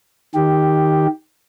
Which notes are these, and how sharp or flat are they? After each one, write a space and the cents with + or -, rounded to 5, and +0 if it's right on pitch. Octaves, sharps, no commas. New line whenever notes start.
D#3 +0 G4 +0